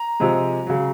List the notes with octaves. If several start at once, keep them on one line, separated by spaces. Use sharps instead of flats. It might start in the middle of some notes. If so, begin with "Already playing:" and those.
Already playing: A#5
C3 F3 G#3
C#3 F#3